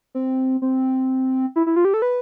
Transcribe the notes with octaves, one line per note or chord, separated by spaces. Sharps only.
C4
C4
E4
E4
F4
G4
A4
B4